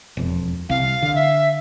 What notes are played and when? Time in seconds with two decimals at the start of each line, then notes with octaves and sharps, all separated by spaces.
0.17 E1 F2
0.70 C2 F5
1.02 D3
1.15 E5